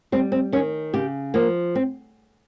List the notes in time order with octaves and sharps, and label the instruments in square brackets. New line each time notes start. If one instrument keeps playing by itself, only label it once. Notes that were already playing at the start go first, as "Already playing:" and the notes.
[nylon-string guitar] G3 C4
C4
D#3 C#4
C#3 G4
F3 A#3
C4